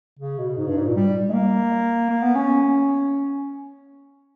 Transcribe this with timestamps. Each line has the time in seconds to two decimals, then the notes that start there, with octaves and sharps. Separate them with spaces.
0.19 C#3
0.38 B2
0.57 G#2
0.67 G2
0.77 G#2
0.86 A#2
0.96 G3
1.29 G#3
1.33 A#3
2.09 A#3
2.23 B3
2.35 C#4